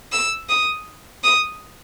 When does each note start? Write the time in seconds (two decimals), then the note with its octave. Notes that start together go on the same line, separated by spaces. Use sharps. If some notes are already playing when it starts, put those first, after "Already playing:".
0.12 E6
0.49 D#6
1.24 D#6